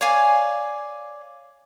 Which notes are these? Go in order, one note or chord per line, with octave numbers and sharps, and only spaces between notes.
C#5 D5 F5 G#5